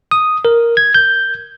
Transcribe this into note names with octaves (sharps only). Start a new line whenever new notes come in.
D#6
A#4
G#6
G6